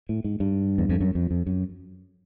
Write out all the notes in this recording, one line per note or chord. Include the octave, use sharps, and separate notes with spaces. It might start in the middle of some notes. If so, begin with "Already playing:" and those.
A2
G#2
G2
E2
F2
F#2
F2
F2
F#2